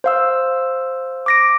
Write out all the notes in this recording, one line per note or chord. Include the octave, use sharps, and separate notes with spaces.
C5 F5 E6
D6 A#6 D7